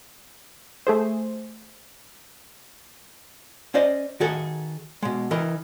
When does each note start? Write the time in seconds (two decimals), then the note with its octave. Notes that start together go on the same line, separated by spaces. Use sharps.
0.87 A3 G#4 C5
3.74 C#4 C5 D5 D#5
4.20 D#3 F#4 G#4 A4
5.03 B2 G#3
5.31 E3 A#4 D#5